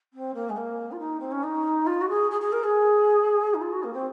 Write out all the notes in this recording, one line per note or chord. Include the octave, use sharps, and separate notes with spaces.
C4
A#3
G#3
A#3
F4
D#4
C4
C#4
D#4
F4
F#4
G#4
G#4
G#4
A#4
G#4
D#4
F4
F#4
A#3
C4